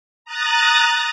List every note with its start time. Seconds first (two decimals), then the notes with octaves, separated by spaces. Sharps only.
0.25 A#5 D#6 F#6 A6